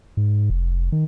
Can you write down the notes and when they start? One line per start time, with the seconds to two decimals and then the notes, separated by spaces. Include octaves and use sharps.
0.17 G#2
0.50 F1
0.92 D#3